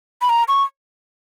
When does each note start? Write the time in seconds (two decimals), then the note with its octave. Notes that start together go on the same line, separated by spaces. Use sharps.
0.21 B5
0.29 A#5
0.48 C#6